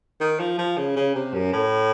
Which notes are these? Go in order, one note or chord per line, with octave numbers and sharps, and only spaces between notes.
D#3
F3
F3
C#3
C#3
C3
F#2
A2